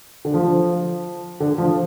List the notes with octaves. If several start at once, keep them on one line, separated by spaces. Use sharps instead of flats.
D3
F3
D3
F3